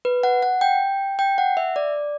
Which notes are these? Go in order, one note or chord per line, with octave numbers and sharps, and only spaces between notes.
B4
F#5
F#5
G5
G5
F#5
E5
D5